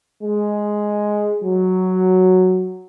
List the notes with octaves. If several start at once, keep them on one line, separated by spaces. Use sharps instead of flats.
G#3
F#3